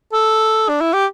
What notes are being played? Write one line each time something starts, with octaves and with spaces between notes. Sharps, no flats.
A4
D4
E4
G4